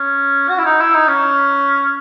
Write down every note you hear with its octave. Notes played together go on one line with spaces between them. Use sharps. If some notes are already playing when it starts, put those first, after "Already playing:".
Already playing: C#4
F#4
E4
D#4
E4
D#4
C#4